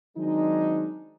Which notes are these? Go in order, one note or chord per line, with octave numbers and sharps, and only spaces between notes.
D#3 F#3 G#3 C4 D4 D#4